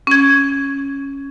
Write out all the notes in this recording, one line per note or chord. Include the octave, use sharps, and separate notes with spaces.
C#4 G#6